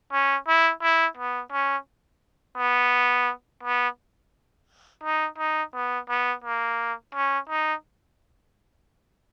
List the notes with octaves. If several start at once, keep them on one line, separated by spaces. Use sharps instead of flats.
C#4
E4
E4
B3
C#4
B3
B3
D#4
D#4
B3
B3
A#3
C#4
D#4